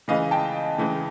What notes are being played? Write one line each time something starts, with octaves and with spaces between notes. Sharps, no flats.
C#3 E3 G#3 D#5 F5
G5 A5
C#3 E3 G#3